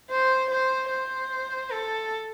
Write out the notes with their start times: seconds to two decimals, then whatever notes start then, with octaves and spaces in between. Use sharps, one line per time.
0.10 C5
0.51 C5
0.91 C5
1.71 A4